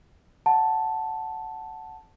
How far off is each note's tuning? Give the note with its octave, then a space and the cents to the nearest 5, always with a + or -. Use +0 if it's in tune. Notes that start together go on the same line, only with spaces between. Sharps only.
F#5 +0 A5 +0